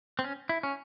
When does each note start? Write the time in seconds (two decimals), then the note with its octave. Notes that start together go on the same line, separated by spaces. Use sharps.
0.19 C4
0.24 C#4
0.49 E4
0.63 C#4